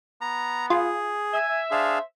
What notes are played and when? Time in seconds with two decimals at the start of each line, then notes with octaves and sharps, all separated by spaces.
0.21 B3 A#5
0.70 F4 G#4
1.34 E5 G#5
1.71 D4 G#4 C5 F5